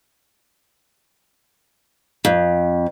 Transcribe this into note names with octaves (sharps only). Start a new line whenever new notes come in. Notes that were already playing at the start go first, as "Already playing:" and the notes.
F2